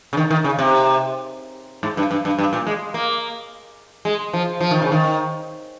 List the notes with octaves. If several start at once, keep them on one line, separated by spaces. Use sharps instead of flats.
C#3
D#3
D#3
C#3
C3
G#2
G2
G2
G2
G2
A#2
G#3
A#3
G#3
F3
F3
D#3
C#3
D#3